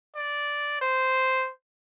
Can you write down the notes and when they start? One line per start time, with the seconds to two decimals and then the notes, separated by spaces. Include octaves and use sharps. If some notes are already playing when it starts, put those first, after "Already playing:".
0.16 D5
0.81 C5